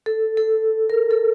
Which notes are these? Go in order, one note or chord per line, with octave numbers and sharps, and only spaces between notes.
A4
A4
A#4
A4